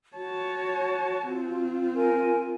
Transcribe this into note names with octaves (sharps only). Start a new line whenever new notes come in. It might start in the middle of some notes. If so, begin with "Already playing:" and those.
F#4 C#5 A5
C4 F4
A#4 G#5